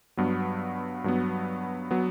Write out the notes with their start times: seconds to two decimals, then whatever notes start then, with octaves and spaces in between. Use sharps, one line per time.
0.17 G2 F#3 B3
1.04 G2 F#3 B3
1.91 F#3 B3